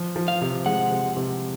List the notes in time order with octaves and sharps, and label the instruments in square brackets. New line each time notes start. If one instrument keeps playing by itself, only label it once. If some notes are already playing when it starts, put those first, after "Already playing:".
Already playing: [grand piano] F3
F3
[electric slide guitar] F5
[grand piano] C3
[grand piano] G#3 [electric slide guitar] F#5
[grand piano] C3
C3